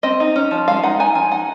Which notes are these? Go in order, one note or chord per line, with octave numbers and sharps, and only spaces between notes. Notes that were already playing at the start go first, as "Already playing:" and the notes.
C4 D#5
D#4
C#4
F3
G#3 F5
D#4 F#5
D#4 G#5
F3 G#5
D#4 F#5